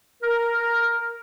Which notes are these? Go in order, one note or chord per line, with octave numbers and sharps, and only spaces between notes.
A#4